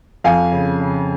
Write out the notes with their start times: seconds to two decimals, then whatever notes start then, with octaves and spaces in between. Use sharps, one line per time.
0.24 F2 F5 G#5
0.52 C#3
0.80 C#3